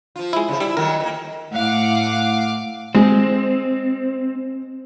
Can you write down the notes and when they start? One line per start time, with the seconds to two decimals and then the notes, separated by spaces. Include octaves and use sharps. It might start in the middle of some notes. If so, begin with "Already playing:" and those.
0.16 F3 F4
0.33 G#3 E4
0.48 C#3 F3
0.60 G3 E4
0.77 D#3 F#3 A3 A#4
1.00 E3 A#3
1.53 A2 F5 F#5 D6
2.95 G#3 C4